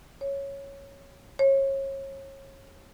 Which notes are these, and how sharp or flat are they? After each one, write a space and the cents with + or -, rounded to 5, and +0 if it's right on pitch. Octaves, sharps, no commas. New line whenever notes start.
C#5 +0
C#5 -30